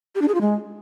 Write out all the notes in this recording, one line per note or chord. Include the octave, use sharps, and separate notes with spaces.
G4
D4
G#4
F4
G#3